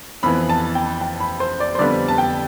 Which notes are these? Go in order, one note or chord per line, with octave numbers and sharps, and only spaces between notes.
F2 E3 B3 B5
A5
G5
G5
B5
C5
D5
C5
F2 D3 G3 B3 D5
A5
G5